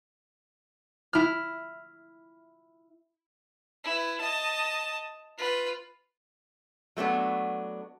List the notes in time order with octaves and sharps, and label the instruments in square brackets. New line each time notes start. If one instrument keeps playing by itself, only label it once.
[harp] E4 F6
[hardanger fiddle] E4 B4
D#5 A5
F4 B4
[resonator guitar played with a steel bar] F#3 A3 B3 D4